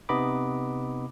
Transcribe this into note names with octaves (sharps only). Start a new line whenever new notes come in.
C3 B3 D#4 D#5 B5 D6